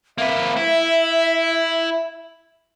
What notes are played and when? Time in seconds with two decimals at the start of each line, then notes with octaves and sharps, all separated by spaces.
0.18 A#3 B4 E5
0.57 E4